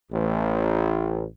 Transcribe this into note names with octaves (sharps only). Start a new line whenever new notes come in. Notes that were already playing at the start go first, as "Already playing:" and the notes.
A1